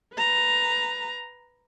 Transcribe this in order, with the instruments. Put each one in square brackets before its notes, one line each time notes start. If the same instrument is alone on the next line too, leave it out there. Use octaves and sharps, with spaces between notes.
[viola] B4 A#5